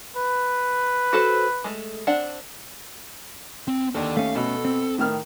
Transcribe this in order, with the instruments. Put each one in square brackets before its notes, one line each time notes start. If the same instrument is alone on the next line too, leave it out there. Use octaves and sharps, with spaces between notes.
[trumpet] B4
[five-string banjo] F#4 A4 C5
G#3 A3
C4 D4 F#5
[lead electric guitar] C4
[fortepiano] D#2 [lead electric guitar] A4 D5
[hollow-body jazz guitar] A3 C#4 [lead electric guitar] F5
[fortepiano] B2 [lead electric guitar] A4
[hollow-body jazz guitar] C4
[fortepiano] A2 D#3 F6